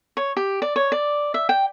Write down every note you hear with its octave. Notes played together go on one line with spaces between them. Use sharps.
C#5
G4
D5
C#5
D5
E5
G5